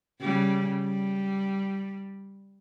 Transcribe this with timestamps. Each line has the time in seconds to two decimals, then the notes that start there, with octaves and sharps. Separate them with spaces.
0.21 C#3 G3
0.84 G3